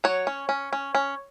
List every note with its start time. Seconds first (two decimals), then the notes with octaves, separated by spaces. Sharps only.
0.04 F#3 C#5
0.27 C#4
0.49 C#4
0.73 C#4
0.95 C#4